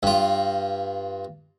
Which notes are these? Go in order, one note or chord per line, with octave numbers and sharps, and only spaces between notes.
G2 F4